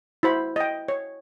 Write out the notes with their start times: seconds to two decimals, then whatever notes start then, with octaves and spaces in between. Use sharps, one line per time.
0.23 E4 F#4 C5 B5
0.56 D#5 G5
0.88 C#5